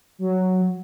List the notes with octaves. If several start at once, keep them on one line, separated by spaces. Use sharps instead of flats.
F#3